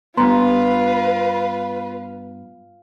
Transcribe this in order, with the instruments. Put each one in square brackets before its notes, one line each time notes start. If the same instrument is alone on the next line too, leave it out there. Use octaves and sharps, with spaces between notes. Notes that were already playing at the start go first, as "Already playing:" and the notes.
[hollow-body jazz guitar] G2 B3 [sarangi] F4 [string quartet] B4 [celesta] A#5 C6